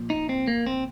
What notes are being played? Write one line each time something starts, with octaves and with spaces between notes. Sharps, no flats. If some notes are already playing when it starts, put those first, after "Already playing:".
Already playing: A#2 F3
D#4
C4
A#3
C4